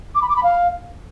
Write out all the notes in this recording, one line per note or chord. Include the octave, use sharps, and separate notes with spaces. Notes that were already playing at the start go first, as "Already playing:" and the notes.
D6
B5
D6
B5
F5